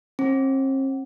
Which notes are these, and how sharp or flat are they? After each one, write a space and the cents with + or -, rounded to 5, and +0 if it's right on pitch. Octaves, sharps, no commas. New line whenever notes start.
C4 +45